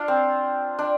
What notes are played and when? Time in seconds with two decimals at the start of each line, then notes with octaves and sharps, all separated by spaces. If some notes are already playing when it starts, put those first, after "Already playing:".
Already playing: D4 F4
0.08 C4
0.79 D4